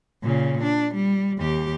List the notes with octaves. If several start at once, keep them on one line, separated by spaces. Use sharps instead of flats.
A#2 C#3
D4
G3
D#2 G4